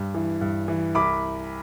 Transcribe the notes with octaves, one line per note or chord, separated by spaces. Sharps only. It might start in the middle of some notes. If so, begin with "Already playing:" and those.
Already playing: G2
E3
G2
E3
C2 B5 D6